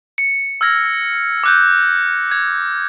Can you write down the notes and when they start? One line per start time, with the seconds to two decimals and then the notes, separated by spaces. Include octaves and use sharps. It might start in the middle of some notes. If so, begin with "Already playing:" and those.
0.18 C#7
0.61 E6 F6 G#6 A#6
1.43 D6 F#6 G6
2.31 G#6